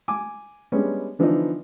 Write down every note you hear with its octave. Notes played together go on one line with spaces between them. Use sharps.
G#5 D6
G3 G#3 B3 C#4 D4
D3 E3 F3 B3 D4 D#4